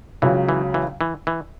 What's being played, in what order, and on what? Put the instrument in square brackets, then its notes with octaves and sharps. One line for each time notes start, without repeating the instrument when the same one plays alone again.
[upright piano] C#2 C#3 F#3 [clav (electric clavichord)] E3
[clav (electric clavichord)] E3
E3
E3
E3